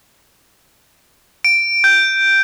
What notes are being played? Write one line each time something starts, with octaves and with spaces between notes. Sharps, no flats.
D7
G6